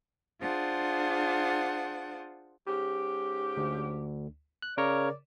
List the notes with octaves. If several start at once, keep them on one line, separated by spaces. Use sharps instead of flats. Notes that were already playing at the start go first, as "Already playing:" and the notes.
D4 F4 G#4 C5 F#5
G#2 C#4 G4
D2
F#6
C#3 A#4 C#5 D5